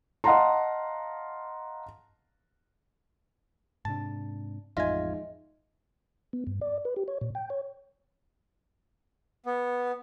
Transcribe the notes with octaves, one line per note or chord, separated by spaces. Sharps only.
D#5 F5 F#5 A5 A#5 C6
G#2 C3 D4 A5
A1 F2 G#2 F4 D#5 E5 G#5
B3
G2
D5
B4
G4
C#5
A#2
G5
C#5
B3